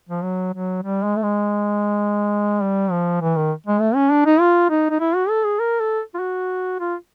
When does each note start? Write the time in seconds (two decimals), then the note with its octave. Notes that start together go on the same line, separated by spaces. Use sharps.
0.09 F3
0.23 F#3
0.53 F#3
0.82 G3
1.03 G#3
1.16 A3
1.23 G#3
2.62 G3
2.91 F3
3.21 E3
3.37 D#3
3.67 G#3
3.81 A3
3.95 C#4
4.11 D4
4.26 D#4
4.41 F4
4.70 D#4
4.90 D#4
5.00 E4
5.15 F#4
5.29 A4
5.44 G#4
5.60 A#4
5.80 A4
6.14 F4
6.19 F#4
6.80 F4